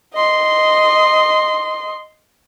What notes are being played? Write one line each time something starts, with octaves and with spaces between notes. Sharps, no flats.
D#5 C6